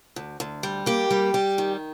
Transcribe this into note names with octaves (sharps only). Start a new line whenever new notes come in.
D2
D2
G3
A#3 G4
G3
G3
D#3